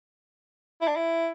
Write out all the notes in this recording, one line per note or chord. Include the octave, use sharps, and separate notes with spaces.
E4
D4
E4